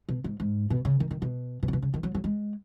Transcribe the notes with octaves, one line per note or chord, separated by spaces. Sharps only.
B2
G#2
G#2
B2
C#3
D#3
D#3
B2
B2
C#3
B2
C#3
D#3
F#3
F#3
G#3